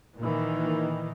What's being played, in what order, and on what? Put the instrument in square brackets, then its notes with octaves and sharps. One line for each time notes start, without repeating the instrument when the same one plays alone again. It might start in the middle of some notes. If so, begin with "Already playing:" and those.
[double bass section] A#2 D#3 E3